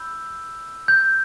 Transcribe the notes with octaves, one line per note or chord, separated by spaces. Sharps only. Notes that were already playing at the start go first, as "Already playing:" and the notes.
Already playing: B5 E6 G6
G6